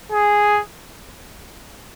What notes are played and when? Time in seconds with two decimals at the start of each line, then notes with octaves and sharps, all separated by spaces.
0.12 G#4